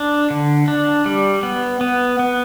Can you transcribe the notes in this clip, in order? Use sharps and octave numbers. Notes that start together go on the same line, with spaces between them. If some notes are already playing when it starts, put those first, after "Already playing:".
Already playing: D4
D3
D4
G3
B3
B3
B3